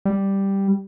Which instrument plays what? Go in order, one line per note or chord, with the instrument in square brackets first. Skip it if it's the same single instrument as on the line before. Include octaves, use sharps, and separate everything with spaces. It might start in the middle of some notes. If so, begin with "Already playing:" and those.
[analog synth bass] G3